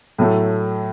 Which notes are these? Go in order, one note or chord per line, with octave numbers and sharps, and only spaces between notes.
A2 F#3 A3